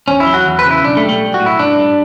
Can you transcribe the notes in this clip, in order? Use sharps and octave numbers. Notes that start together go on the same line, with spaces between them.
E2 C#4
E4
F#3
F#4
E2
B4
C#3
E4
B1 D4
A3
G3
A3
B1
F#4
A2
E4
G2 D4
G3